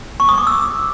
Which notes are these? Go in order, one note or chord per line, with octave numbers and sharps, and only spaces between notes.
C#6
D#6
D6
E6